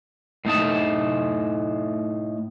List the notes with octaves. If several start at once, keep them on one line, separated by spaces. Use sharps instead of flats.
A2 A3 D#4 A5